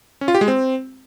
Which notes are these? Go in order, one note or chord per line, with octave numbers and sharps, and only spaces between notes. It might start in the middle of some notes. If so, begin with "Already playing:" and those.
C#4
F4
G4
G#3
C4